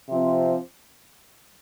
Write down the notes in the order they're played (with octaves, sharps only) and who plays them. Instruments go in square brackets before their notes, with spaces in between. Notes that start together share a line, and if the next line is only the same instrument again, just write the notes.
[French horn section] C3 F3 C4